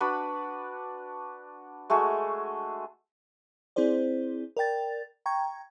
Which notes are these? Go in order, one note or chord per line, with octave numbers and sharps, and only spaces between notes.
D4 F#4 B4 B5
G#3 A3 F#4 G#4
C4 E4 G#4 C5 D5
A#4 D5 G5 A6
G5 A#5 C#6 G#6